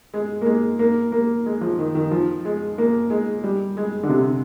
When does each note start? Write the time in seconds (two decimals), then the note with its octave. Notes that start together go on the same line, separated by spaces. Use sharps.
0.14 G#3
0.42 A#3
0.46 G#3
0.79 A#3
1.12 A#3
1.46 G#3
1.61 F3
1.79 D#3
1.95 D#3
2.11 F3
2.45 G#3
2.78 A#3
3.10 G#3
3.44 G3
3.77 G#3
4.03 D3
4.09 C3